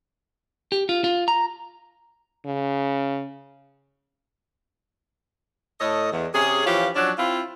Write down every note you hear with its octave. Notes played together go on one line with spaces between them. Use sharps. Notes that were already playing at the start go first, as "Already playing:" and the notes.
G4
F4
F4
A#5
C#3
A2 A4 C#5 D#5
E2
C3 C#4 G#4
E3 F3 C#4 F4 G4
F3 F#3 C#4 D4
C4 E4 F4